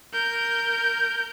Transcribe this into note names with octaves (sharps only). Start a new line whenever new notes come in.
A#4 G6